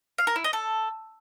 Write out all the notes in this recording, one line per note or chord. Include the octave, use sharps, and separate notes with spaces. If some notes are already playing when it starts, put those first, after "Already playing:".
F5
A#4
E4
D#5
A4